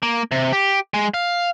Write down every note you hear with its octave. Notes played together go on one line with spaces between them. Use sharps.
A#3
C3
G4
G#3
F5